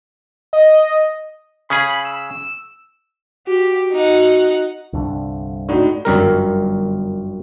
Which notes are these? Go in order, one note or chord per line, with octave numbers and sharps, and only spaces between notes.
D#5
C#3 C#4 G#4 B5
E6
F#4 G4
D#4 F#5
C2 G2 D3
A2 D4 D#4 F#4
G1 F#2 G3 A#4